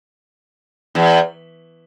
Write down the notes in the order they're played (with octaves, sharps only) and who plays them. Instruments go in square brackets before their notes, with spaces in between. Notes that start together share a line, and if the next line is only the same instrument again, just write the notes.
[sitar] E2